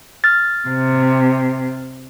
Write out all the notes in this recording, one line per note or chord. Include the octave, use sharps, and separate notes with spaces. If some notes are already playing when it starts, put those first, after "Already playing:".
F6 A6
C3